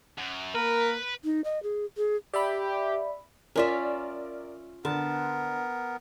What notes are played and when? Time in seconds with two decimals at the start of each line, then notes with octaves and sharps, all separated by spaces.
0.18 F#2
0.55 A#3 A#4 B4
1.24 D#4
1.44 D#5
1.63 G#4
1.97 G#4
2.34 G4 D5 E5 B5
3.56 C#4 F4 A#4 D5 E5
4.85 D3 B3 A#4 A5